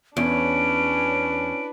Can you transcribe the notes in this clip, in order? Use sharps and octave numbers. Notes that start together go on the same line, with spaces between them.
E2 C#4 D4 B4 D7